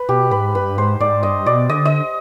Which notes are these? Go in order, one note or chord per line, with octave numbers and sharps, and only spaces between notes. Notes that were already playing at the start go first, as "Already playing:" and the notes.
Already playing: B4
B2 G4
G#2 B4
G2 B4
G#2 C5
G#2 D5
G2 D#5
B2 D5
D3 D#5
D#5